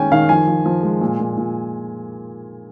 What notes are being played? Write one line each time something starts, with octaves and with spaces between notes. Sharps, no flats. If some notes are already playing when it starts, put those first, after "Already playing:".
Already playing: D#3 G#3 A#3 C#4 G5 G#5
D#3 F5
F3 G#5
F3
F3
G#3
A#2
A#2
A#2